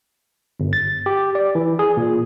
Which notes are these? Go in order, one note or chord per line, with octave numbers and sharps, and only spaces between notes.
G1
A6
G4
D5
E3
G#4
A#2